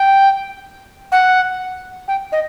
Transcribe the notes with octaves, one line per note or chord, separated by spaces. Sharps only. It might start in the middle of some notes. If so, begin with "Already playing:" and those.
Already playing: G5
F#5
G5
D#5